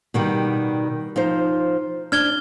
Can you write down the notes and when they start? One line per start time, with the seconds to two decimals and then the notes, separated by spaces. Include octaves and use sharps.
0.14 B2 D#3 G3
1.16 F3 D#4 C5
2.12 D4 F6 G#6 G7